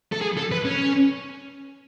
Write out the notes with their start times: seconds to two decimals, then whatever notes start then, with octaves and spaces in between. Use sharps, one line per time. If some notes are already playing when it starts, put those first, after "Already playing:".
0.13 A4
0.22 G#4
0.37 A4
0.52 B4
0.65 C#4